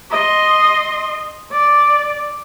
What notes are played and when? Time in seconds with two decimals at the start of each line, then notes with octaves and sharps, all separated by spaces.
0.11 D#5 C6
1.51 D5